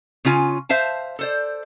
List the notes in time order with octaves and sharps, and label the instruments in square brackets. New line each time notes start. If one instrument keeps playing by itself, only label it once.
[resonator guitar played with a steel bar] C#3 C#4 F4 G#5
C5 E5 F5 A5
A4 C5 D5